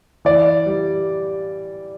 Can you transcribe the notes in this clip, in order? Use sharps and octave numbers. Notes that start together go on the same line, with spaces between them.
E3 D5
G3